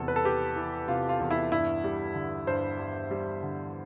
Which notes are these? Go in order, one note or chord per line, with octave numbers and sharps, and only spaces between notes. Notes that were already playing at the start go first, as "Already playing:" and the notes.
Already playing: E2 C3 E3 A4
B4
A4
B3 G4
E3
C3 F4
F4
E2
E4
G2 E4
G3
D3
G2 C5
G2
G3
D3